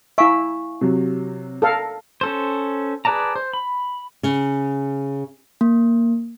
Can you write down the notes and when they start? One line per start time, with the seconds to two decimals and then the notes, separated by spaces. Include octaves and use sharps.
0.18 E4 E5 F5 G#5 C#6
0.81 C3 F#3
1.62 A4 A#4 F5
2.21 C#4 A4 C5
3.05 G#4 B4 D5 A5 A#5
3.36 C5
3.53 B5
4.23 C#3
5.61 A#3